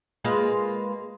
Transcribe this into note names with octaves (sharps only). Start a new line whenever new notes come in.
G#3 A#3 F4 B4